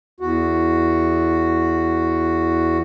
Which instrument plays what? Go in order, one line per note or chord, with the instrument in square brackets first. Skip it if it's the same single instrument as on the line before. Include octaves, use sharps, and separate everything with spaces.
[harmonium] E2 F#4